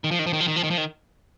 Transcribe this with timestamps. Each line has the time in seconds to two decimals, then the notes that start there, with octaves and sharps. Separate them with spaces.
0.04 D#3
0.11 F3
0.19 D#3
0.27 F3
0.33 D#3
0.40 F3
0.48 D#3
0.56 F3
0.64 D#3
0.71 F3
0.78 D#3